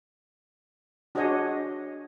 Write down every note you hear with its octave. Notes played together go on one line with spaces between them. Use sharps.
D4 F#4 G#4 C#5 D#5